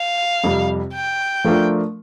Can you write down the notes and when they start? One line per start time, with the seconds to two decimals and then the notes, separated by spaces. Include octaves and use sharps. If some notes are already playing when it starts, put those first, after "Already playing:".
Already playing: F5
0.44 F2 C3 G3
0.94 G5
1.44 F3 A3 D4 F4 A#4